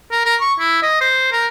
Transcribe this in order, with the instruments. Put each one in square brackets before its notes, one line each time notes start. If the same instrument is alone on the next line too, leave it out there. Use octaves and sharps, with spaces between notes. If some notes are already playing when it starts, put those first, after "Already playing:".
[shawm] A#4
A#4
C#6
E4
D#5
C5
A#4